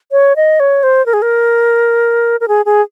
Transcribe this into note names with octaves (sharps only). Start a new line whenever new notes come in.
C#5
D#5
C#5
C5
A#4
G#4
A#4
A#4
G#4
G#4